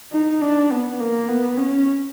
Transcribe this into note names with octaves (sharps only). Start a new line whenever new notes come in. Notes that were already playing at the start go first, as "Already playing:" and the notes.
D#4
D4
B3
A#3
B3
C#4